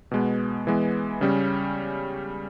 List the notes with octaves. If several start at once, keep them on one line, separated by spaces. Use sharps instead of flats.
B2 G#3 B3
E3 G#3 B3
C#3 G3 C#4